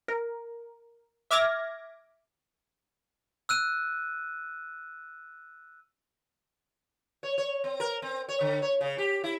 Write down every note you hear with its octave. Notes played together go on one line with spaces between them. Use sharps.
A#4
E5 D6 F6 G#6 A#6
E6 F#6 D#7
C#5
C#5
C4
A#4
C4
C#5
D3
C#5
C#3
G4
E4